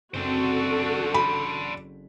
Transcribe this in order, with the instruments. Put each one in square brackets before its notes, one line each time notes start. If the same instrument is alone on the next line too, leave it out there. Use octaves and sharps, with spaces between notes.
[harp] F#1 C4 [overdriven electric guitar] D4 C5 [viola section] F#4 A4
[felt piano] B5